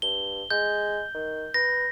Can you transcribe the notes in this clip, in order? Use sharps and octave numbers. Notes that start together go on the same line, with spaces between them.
G2 G7
G#3 G6
D#3
B4 A#6